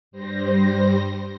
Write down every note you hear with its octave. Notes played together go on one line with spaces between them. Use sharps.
G2 G3 C5 A#6